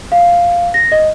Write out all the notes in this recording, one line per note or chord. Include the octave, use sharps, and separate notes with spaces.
F5
A#6
D#5